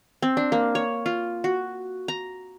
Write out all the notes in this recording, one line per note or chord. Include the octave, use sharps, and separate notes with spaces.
C4
D4
A#3
C#5
F4
F#4
A#5